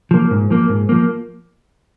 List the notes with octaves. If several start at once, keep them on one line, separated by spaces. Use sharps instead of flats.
F3 A#3
G#2
F3 A#3
G#2
F3 A#3